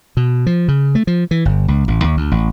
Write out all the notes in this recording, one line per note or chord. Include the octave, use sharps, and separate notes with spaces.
B2
F3
C#3
A3
F3
E3
G1
C#2
A1
D#2
D2
A1